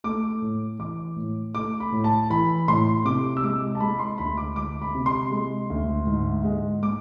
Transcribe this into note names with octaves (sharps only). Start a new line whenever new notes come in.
A3 D6
A2
E3 D6
A2
A3 D6
B5
A2
A5
E3 B5
A2 C6
C3 D6
E6
G#3 D6
A5
G#3 B5
C6
D2 B5
D6
G#3 D6
B5
C3
C6
G#3
D2
G#2
G#3
G#3 D6